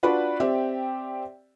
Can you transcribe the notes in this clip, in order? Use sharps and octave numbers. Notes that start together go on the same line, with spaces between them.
D4 F4 F#4 B4 D5 F#5
C4 G4 D5 E5 G5